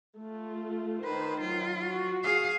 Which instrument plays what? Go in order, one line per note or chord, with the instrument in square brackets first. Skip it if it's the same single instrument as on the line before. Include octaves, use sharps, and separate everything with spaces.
[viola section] A3 F4
[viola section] D#3 C5 [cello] B4
[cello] F#3 F4
[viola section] F#4
[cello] G#4 F5